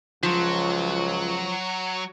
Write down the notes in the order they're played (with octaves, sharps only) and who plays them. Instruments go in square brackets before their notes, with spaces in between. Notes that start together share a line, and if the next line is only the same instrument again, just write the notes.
[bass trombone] C#2 [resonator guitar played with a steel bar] F3 [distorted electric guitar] F#3